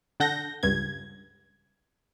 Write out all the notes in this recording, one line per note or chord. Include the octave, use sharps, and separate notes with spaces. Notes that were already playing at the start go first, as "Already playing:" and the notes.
D3 A4 F#5 G6 A#6
C#2 G2 G#6